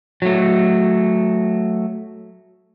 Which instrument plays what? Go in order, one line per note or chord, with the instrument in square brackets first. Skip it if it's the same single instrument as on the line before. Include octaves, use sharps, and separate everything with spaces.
[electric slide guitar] F#3 A3